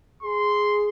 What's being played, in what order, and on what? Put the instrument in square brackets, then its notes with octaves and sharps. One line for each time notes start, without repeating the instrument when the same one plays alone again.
[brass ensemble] G#4 [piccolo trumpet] C6